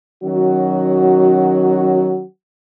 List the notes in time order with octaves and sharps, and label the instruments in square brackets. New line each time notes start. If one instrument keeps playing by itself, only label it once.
[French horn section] D#3 F#3 C#4 F#4